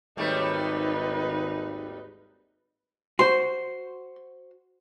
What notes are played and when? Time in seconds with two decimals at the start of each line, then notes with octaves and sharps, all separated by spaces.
0.17 G#1 D#2 G3 A3 D#4 B4
3.19 F#4 C5 C6